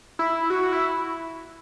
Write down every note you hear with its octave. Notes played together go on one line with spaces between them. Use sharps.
E4
F#4
E4